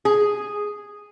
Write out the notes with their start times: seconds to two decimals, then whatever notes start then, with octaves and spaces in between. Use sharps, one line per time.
0.05 G#4